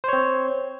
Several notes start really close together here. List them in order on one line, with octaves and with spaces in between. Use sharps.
C5 C#5 C4